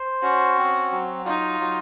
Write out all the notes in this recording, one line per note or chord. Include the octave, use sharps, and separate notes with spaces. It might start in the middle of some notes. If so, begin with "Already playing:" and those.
Already playing: C5
C#4 F#4
C4
F#3
D#4 F4
F#3